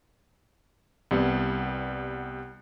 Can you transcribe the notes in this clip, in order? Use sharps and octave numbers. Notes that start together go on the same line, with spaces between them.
C2 G3 B3